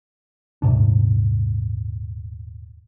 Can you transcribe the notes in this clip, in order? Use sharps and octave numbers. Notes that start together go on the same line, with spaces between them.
D#1 G#2 C3 D4